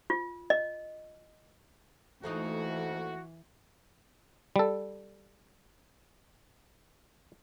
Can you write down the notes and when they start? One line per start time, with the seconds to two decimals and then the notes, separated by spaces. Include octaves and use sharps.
0.10 F4
0.50 D#5
2.23 F2 E3 A3 A#3 D#4 F#4
4.56 G3 A4